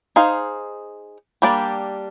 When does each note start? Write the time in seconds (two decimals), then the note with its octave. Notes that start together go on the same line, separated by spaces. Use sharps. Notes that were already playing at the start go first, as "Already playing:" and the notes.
0.16 D#4 G#4 C5 F5
1.42 G3 A#3 D4 G4 D5